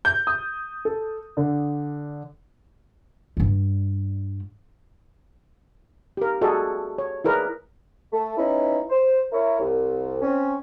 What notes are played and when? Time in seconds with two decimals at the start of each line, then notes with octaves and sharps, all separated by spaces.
0.05 G6
0.27 D#6
0.85 A4
1.37 D3
3.37 G2 G3
6.17 G4 A#4
6.41 F#4 G#4 A4 D5 D#5
6.98 C#5
7.24 E4 G#4 A#4 B4 D5
8.12 A3
8.37 B3 C#4 D#4 E4
8.90 C5
9.32 E4 A#4 C#5
9.60 C2
10.22 C4 C#4